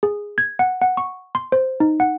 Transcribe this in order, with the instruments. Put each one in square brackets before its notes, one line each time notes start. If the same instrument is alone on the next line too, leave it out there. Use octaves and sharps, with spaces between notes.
[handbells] G#4
G#6
F#5
F#5
C#6
C6
C5
D#4
F#5